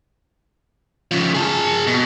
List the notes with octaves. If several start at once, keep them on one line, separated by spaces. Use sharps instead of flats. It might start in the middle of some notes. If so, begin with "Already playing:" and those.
C#3 F3
G#4 A5
B2